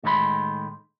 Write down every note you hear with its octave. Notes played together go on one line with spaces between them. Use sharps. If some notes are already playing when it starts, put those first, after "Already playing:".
A2 D#3 G#3 B4 B5 C6